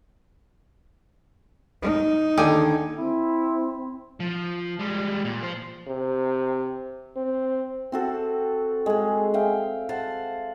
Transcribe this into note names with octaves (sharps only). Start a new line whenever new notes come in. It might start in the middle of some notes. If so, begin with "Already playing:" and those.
D#4
D#2 D3 G#4 G5 D6
C4 E4
F3
G3 G#3
A#2
F4 C5
C3
C4
C4 F#4 A4
G#3 G#4
E5 F5 G5
C5 F5 F#5 A5